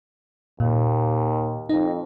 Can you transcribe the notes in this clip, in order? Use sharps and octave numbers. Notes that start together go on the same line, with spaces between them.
D#2 A#2
F2 D#4